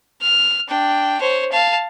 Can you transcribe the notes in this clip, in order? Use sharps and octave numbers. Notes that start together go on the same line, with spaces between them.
F6
D4 G5
C5 C#5
F5 A5